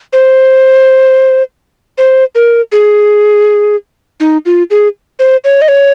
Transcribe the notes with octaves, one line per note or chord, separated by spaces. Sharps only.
C5
C5
A#4
G#4
D#4
F4
G#4
C5
C#5
D#5
C#5